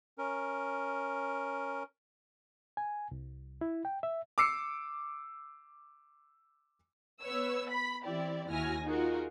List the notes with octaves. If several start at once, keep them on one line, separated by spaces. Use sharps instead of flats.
C#4 A#4
G#5
C2
E4
G5
E5
D6 E6 C7 C#7
B3 B4 C#5 E6
B5 B6
E3 C4 E4 G4 D5
D#2 E4 F#4 G#5 F6 A#6
D#4 F4 F#4 G#4 A#4